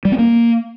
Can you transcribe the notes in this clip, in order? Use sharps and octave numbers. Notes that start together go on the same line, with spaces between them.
G3
C4
A#3